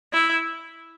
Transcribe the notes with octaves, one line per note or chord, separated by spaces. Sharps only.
E4